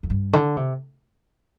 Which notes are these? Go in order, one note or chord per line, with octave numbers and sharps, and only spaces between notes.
F2
G2
D3
C3